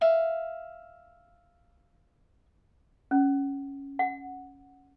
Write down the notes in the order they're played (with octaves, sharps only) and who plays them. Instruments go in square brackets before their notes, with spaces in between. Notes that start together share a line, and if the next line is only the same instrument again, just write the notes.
[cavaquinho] E5 F5
[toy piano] C#4
F#5